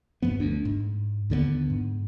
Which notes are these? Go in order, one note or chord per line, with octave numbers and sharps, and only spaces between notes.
G2 F3 B3
D2 D4
G#2
D#2 D3 A3 B3
G#2